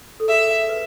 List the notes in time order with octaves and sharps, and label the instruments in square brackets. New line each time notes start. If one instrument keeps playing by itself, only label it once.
[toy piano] A4
[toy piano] G#4 [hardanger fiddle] E5
[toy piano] B4